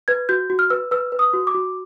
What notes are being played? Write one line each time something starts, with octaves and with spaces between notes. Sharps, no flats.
B4 G#6
F#4 G6
F#4
F6
B4 E6
B4 E6
B4
D#6
F#4
D6
F#4